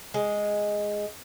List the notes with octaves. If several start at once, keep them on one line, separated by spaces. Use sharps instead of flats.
G#3